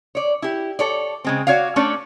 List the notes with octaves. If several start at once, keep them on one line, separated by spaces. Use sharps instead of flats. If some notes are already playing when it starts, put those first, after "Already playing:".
C#5 D5
E4 G4
A4 C#5 D5
C#3 G#3 C4
F#4 C#5 D5 F5
A3 C#4 D4 A4 C#5 D5